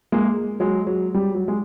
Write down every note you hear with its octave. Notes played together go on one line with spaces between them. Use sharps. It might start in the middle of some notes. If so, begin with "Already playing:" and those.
G#3 A#3
F#3 G#3
F#3
G3
F#3
G#3